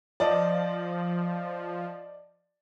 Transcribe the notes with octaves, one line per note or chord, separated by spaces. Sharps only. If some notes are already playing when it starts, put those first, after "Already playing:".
F3 D5 D#5 A5